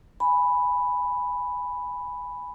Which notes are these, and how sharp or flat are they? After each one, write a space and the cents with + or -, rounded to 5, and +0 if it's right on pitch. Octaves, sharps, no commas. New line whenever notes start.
G#5 -5 B5 +0